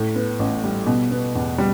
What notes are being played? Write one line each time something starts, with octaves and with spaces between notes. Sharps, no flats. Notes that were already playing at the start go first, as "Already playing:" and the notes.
Already playing: A2
B3
A1
G3
B2
B3
E2
G3